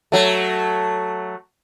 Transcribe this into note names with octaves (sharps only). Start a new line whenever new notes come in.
F#3 A3